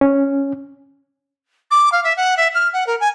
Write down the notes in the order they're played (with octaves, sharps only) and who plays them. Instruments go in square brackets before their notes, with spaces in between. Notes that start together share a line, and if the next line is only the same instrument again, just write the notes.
[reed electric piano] C#4
[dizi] D6
F5
E5
F#5
E5
F6
F#5
A#4
G#5